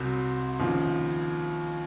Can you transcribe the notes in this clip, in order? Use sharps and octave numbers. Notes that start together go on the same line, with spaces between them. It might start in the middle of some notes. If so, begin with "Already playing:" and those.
Already playing: C2 C3 F#3
D#2 C#3 F3